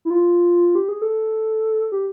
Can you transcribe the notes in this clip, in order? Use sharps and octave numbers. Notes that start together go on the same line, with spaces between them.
E4
F4
G4
G#4
A4
G4